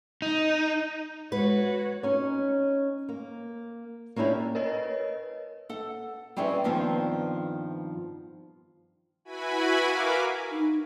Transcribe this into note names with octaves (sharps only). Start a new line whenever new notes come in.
D#4
G#3 F#4 B4 C#5
C#4 D#4 C#5
A#3
A#3 C#4 D4 E4 G4
A#4 B4 C#5 D#5
A4 F#5
G3 C4 C#4 E4 G#4 B4
G2 D#3 F3 B3 C4
E4 F#4 B4 G#5 B5
A#4 F5 D6
D#4